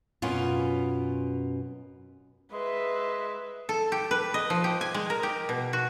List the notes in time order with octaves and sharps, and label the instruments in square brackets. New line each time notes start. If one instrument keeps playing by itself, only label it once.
[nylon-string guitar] F#2 B2 B3 C#4 F4
[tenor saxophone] G#3 [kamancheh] B4 E5
[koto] A4
G4
B4
D#5
F3
G4
G#5
G#3
A#4
G4
B2
F#4